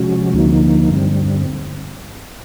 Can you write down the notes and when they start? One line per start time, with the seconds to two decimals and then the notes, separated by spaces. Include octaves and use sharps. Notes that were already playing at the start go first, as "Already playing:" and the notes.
Already playing: C3 F3 G#3 C#4 F#4
0.34 D2 D3 F3 A#3 D#4
0.90 G2 D3 G3 C4